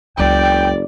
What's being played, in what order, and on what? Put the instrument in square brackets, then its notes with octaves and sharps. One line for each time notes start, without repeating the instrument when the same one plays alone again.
[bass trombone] F#1 [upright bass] C#2 F#3 [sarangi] D5 [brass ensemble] G5